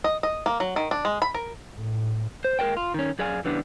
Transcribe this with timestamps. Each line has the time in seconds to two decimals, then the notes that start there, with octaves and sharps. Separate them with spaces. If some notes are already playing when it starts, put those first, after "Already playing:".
0.04 D#5
0.23 D#5
0.46 A#3
0.60 F#3
0.76 D#3
0.91 D4
1.05 G#3
1.22 B5
1.34 A#4
1.74 A2
2.45 C5
2.59 G#3 A#3 A#4 C5 D5 G5
2.77 F4
2.94 D#3 C#4
3.19 F#2 G#4 D5 F5 G#5
3.44 C#3 E3 G3 B3 D4